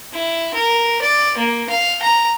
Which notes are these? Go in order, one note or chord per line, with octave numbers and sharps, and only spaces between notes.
E4
A#4
D5
A#3
F5
A#5